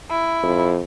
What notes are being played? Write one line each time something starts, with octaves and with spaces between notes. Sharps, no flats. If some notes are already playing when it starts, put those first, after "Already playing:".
E4
F2